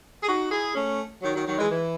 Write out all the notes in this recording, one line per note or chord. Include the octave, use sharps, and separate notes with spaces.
G#4
D#4 F#4
E4 G#4
A3 C#4
D#3 F#3
D#3 F#3
D#3 F#3
E3 G#3
E3